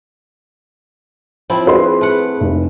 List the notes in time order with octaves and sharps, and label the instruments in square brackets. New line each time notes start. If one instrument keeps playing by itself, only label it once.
[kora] F3 C4 E4
[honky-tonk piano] G#4 B4 C6
[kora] A3 F#5
[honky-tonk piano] F1